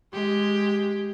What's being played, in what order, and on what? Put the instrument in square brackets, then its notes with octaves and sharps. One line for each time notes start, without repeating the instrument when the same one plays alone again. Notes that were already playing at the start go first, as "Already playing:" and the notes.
[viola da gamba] G#3 G4